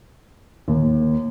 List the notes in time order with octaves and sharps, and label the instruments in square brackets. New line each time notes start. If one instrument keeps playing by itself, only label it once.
[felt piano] D#2